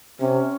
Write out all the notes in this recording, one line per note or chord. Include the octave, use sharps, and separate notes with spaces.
C3 C#4